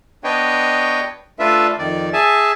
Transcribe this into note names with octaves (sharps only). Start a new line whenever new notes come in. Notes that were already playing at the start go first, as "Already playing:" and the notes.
B3 D4 B4 C#5 D#5 G5
A3 D4 F4 B4 E5
F2 D#3 D5
G#4 E5 G#5 A5